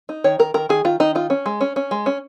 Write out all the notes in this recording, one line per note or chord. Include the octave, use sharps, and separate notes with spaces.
D#4
D#3 C#5
D#3 A#4
D#3 A#4
D#3 G#4
D#3 F4
D#3 D#4
D#4 F4
C#4
G#3
C#4
C#4
G#3
C#4